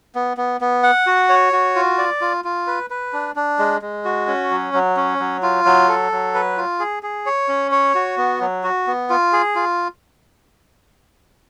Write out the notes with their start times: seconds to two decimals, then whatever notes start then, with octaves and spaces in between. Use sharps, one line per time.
0.15 B3
0.37 B3
0.61 B3
0.83 F#5
1.07 F#4
1.29 C#5
1.53 F#4
1.75 F4
1.98 D5
2.21 F4
2.45 F4
2.67 B4
2.90 B4
3.13 D4
3.36 D4
3.59 G#3
3.82 G#3
4.05 F#4
4.28 C#4
4.51 F#3
4.74 F#3
4.97 C#4
5.20 F#3
5.43 F4
5.65 F#3
5.88 A4
6.12 F#3
6.34 B4
6.57 F4
6.80 G#4
7.03 G#4
7.26 C#5
7.48 C#4
7.71 C#5
7.95 F#4
8.17 B3
8.41 F#3
8.64 F#4
8.87 B3
9.10 F4
9.33 G#4
9.56 F4